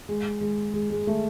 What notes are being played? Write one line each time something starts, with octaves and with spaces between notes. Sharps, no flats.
G#3
G#3
G#3
G#3
A3